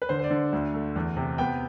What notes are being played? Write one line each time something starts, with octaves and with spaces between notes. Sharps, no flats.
B4
D3 C5
C5
D5
D3
D2
A3
E2
C3
B3 G5